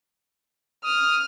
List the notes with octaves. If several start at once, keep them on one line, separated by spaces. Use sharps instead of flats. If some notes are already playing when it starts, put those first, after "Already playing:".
D#6 F6